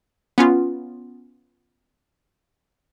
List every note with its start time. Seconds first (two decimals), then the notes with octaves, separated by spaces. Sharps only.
0.38 B3 C#4 F4